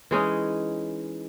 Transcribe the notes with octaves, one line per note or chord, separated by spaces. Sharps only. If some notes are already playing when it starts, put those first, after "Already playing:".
E3 G#3 C#4 D#4